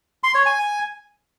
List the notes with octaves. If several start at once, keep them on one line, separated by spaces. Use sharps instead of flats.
C6
C#5
G#5